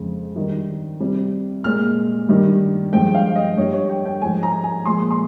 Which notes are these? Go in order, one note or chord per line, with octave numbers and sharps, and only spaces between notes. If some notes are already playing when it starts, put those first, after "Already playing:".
Already playing: F2 C#3 G#3
G2 D#3 G3
C3 G3
A#2 G#3 F6
G2 D#3 G3
G2 F3 G#3 G5
F5
D#5
G2 G3 C#5
C#5
G5
G5
G#2 F3 G#3 G#5
A#5
G#5
A#2 F3 G#3 C6
C6